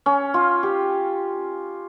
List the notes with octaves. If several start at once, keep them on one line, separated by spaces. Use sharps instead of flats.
C#4
F4
G4